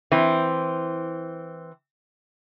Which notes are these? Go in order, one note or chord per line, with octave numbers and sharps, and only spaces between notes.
E3 C4